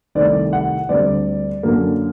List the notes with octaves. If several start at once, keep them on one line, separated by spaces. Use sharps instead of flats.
C2 C3 D#3 A3 D5
F#5
D2 D3 G3 C4 D5
F#2 D3 F#3 A#3